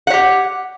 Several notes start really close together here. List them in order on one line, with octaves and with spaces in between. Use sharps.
F#5 C#5 G4